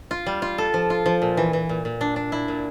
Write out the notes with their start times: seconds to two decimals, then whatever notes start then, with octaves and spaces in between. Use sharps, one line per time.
0.11 F4
0.26 G3
0.42 F4
0.58 A4
0.74 F3
0.90 F4
1.06 F3
1.22 A#2
1.37 E3
1.53 E3
1.69 A#2
1.85 A#2
2.01 D4
2.16 D4
2.32 E4
2.48 A#2